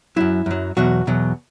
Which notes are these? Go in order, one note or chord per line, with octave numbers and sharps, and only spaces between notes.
F#2 F#3 E4
F#2 F#3
E2 B2 F#3 F#4
E2 B2 F#3